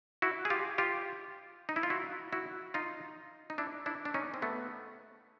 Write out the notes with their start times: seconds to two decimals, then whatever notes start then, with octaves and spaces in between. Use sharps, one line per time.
0.22 E4 F#4
0.45 G#4
0.50 F4 G4
0.78 F4 G4
1.69 D#4
1.76 E4
1.83 F4
1.90 E4 F#4
2.33 E4 F#4
2.74 D#4 F4
3.50 D#4
3.58 D4 E4
3.86 D4 E4
4.05 D4
4.14 C#4 D#4
4.34 C4
4.42 A3 B3